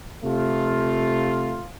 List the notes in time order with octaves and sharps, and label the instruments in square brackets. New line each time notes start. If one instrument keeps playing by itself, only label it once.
[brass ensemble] C3 A3 F4